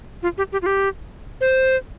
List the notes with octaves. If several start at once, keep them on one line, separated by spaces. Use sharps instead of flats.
F4
G4
G4
F4
G4
C5